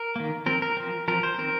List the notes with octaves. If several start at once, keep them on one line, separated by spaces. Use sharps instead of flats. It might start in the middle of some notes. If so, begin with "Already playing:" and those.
Already playing: A#4
D#3 A#3
F3 C4 A#4
A#4
F3 C4
F3 C4 A#4
C5
D#3 C4 A#4